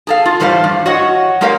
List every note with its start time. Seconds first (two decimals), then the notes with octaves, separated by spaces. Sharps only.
0.07 G#4 A4 F5
0.26 F4
0.40 A2 E3 G3 C5 D5 F5
0.64 G2
0.86 F#4 C#5 D#5 F#5
1.41 G#3 A#3 G4 A#4 C#5 F5